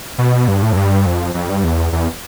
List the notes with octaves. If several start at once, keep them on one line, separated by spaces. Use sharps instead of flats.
B2
G2
A2
F2
G2
F2
F2
G2
E2
E2